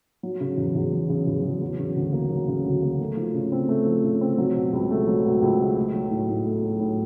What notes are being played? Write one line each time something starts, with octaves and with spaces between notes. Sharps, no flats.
F#3
C#3
E2
E2
F#3
C#3
E2
E2
F#3
C#3
D2
A#3
F#3
C#3
D2
A#3
A3
F3
C#3
C4
A3
F3
C#3
C4
F#3
B2
C#2
A3
F#3
B2
C#2
A3
A3
F#3
A2
A2
A3
F#3
A2